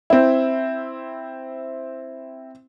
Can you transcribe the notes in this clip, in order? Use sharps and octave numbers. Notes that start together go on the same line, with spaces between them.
C4 E4